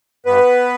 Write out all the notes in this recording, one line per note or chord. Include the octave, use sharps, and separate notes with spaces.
G2 B3 B4